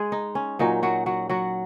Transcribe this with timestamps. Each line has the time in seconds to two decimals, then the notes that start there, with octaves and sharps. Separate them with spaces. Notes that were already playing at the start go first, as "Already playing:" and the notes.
Already playing: G#3 G#4
0.12 D#4
0.35 C#4
0.59 A#2 F#3 C#4 D#4
0.83 F#3 F#4
1.06 F#3 F#4
1.30 F#3 F#4